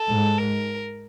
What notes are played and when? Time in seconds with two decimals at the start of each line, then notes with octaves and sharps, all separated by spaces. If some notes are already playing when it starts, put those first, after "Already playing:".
Already playing: A4
0.08 G#2
0.38 A#4